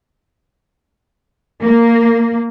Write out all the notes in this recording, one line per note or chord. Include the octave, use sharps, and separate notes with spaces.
A#3